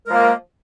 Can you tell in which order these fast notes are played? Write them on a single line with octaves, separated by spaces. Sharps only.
A#4 G#3 F3 A#3